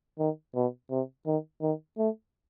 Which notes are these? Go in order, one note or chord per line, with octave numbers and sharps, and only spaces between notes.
D#3
B2
C3
D#3
D#3
A3